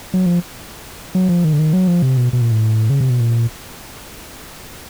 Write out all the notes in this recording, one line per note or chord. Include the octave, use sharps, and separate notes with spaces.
F#3
F3
F#3
F3
D#3
D3
D#3
F#3
F3
C3
B2
B2
A#2
A2
C#3
C3
B2
A#2